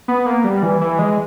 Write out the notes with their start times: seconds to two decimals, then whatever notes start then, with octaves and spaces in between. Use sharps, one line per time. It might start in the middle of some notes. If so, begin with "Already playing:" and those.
0.08 B3
0.26 A#3
0.44 G3
0.63 E3
0.81 E3
0.99 G#3